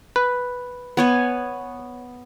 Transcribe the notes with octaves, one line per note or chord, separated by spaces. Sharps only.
B4
B3 C#5 G#5